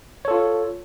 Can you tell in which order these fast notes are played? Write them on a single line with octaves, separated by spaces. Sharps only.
C#5 A4 F4